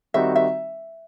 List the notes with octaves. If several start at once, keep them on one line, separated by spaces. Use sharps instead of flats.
D#3 G3 C4 D#4 F#4 E5
E5